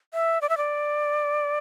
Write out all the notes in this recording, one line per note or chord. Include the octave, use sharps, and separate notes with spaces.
E5
D5
E5
D5